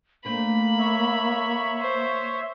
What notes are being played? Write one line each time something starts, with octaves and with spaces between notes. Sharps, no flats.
A3 A#3 C4 D4 B5
C#5 E5
C5